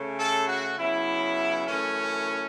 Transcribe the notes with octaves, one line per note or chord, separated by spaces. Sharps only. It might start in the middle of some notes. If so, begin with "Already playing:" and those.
Already playing: C#3 A3
A4
F#4
C#3 F#3 B3 E4
F#2 E3 A3 C#4